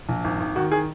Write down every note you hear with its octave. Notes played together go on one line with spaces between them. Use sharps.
A#1
G#1
G#1
D#3 F#4
D#3 G#4